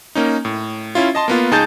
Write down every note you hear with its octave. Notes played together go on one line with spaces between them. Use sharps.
A#3 C#4 D#4
A2
C#4 E4 F4
D#5 A5 C6
A#3 B3 F4
C#2 D#4 G#4 A5 G6 A6